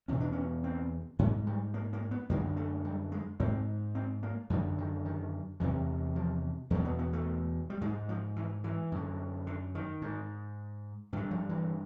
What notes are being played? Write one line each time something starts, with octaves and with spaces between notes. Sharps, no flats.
E2 B2 C#4
D4
C#4
C4
G#2 G#3
G3
A#3
A#3
B3
F#2 D3 A#3
A3
G3
G#3
G#2 C4
C4
A#3
F#2 D3 F3
D#3
D#3
E2 C3 E3
F3
E2 B2 F3
B3
B3
A3
G3
G#2 G#3
F3
E3
E3
F#2 D3
D3
D#3
G#2
G2 D3 E3
F3
E3